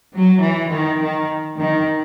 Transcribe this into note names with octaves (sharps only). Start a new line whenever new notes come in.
F#3
E3
D#3
D#3
D#3